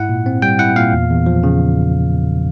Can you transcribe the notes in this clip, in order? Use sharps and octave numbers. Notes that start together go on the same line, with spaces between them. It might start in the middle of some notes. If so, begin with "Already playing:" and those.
Already playing: G#2 E4 F#5
A#2
C4
G3 G5
E4 F#5
A#2 F5
E2
E2
F3
C#3